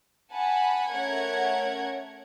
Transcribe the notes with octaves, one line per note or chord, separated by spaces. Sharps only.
F#5 G#5 A5 B5
A3 C#4 A#4 C#5 F#5 G#6